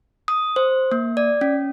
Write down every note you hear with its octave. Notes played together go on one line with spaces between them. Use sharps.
D#6
C5
A#3
D5
C#4